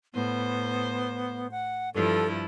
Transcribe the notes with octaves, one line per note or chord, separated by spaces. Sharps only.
A2 B3 C5
F#5
G2 F3 E4 A4